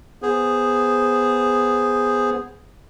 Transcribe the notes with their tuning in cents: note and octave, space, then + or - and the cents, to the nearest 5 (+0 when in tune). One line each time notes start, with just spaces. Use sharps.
B3 +0 G#4 -5 C5 +0